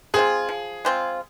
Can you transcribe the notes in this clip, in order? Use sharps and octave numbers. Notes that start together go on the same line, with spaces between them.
G#3 C4 F4 G#4
F3
G#3 C4 F4